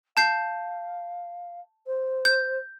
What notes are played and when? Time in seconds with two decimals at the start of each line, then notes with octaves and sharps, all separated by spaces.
0.17 F5 A5 G6 C7
1.86 C5
2.25 G6